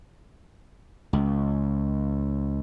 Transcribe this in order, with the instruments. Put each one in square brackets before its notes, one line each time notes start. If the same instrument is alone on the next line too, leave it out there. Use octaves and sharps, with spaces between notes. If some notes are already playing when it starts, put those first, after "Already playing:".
[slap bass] C#2